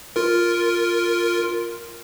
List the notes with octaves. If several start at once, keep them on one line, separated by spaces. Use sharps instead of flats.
F4 A#4